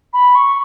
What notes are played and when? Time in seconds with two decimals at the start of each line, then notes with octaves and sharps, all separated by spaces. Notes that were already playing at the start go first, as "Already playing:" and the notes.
0.13 B5
0.35 C#6